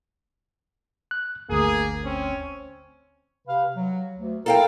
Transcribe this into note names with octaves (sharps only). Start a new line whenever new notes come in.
F#6
G1 D2 A#3 G#4
C4 C#4
C3 B4 F5
F#3
D2
E4 A4 A#4 F5 G5